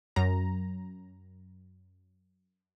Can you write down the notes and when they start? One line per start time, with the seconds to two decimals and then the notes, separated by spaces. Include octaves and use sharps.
0.16 F#2 A#5